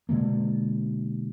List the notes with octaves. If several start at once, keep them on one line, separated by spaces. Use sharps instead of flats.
B2 D3 G#3 A#3